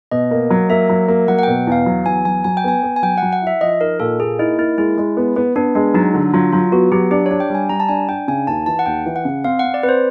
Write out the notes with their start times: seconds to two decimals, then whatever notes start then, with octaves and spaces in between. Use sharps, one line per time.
0.12 B2 D#5
0.31 A#3
0.50 F#3
0.70 A#3 E5
0.89 F#3
1.08 A#3
1.28 F#3 F#5
1.39 F#5
1.43 B2 G5
1.67 E2 F5
1.86 F#3
2.05 E2 G#5
2.25 F#3 G#5
2.44 F#3 G#5
2.57 G5
2.64 B3 G#5
2.83 B3
2.96 G#5
3.03 F#3 G5
3.18 F#3 F#5
3.33 F#5
3.42 E4 E5
3.61 F3 D#5
3.81 D#4 A#4
4.00 A#2 A4
4.19 A#3 G#4
4.39 D#4 E4
4.59 A#3 E4
4.78 G#3 E4
4.98 G#3
5.17 B3
5.36 B3
5.56 B3 D4
5.75 G#3 D4
5.94 F#3 D#4
6.14 D3
6.34 F#3 F4
6.52 F#3 F4
6.72 B3 F#4
6.92 F#3 G4
7.11 D4 G4
7.26 D4 C#5
7.40 G5
7.50 G3 G#5
7.69 G3 A#5
7.80 A5
7.89 D4 G#5
8.08 D4 G5
8.28 C#3 G#5
8.47 D#2 A5
8.66 E3 A5
8.79 F#5
8.86 D#2 G5
9.06 E3
9.16 F#5
9.25 C#3
9.44 C4 F5
9.59 C4 F#5
9.74 D5
9.83 C4 B4
9.89 C5